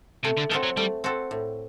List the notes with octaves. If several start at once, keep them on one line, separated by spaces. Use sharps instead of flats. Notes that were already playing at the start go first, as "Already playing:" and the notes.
C3 A3
D3
D#3 C4 F#4 A4
F#3
G3 A3
C4 F#4 A4
A2